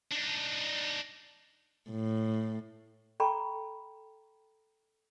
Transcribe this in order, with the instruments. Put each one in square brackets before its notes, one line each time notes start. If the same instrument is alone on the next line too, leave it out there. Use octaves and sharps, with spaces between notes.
[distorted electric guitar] D4 D#4
[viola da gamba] A2
[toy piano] A4 G5 A#5 B5 C#6